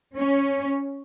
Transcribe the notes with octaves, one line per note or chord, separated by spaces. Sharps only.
C#4